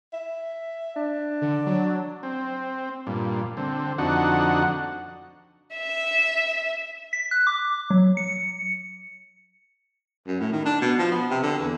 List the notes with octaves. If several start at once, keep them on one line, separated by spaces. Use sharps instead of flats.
E5
D4
D3
F#3
C4
G2 A#2
D3 C4
F2 D3 D4 D#4 F#4 F#5
E5
B6
F#6
D6
F#3
C#7
F#2
A2
D#3
D4
B2
F3
B3
C3
D3
E2